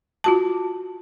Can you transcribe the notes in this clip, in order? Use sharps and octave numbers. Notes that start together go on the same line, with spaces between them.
F4 F#4 A5